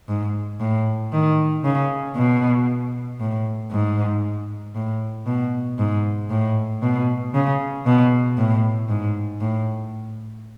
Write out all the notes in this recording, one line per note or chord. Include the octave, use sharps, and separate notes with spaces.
G#2
A2
D#3
C#3
B2
A2
G#2
A2
B2
G#2
A2
B2
C#3
B2
A2
G#2
A2